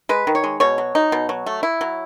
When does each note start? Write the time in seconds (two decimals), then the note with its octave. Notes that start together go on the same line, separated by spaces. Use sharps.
0.09 G#3 B4
0.27 D#3
0.35 C#5
0.44 G#3
0.60 B2 C#5
0.78 F#3
0.95 D#4
1.12 B2
1.29 F#3
1.46 A3
1.63 E4
1.81 F#3